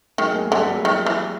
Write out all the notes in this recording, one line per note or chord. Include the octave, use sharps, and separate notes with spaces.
D#3 F#3 G#3
G#3 A#3
D3 G3 A3
F#3 G#3
D#3 F3 G3
E3